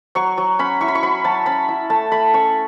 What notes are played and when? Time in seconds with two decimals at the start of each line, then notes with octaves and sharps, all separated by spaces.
0.15 F#3 C#6
0.38 F#3
0.59 C#4 B5
0.81 E4 C#6
0.88 B5
0.95 C#6
1.03 F#3 B5
1.24 F#3 A5
1.46 C#4 B5
1.69 E4
1.90 A3 A5
2.12 A3 B5
2.34 C#4 C#6